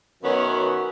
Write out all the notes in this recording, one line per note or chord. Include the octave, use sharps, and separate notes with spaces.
F#2 D#3 F#3 B3 C#4